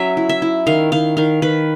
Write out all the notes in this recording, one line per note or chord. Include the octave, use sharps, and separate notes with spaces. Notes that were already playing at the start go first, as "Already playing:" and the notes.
Already playing: F#3 C#4 E5
E4
E5
E4
D#3 F5
D#3 F5
D#3 F5
D#3 B4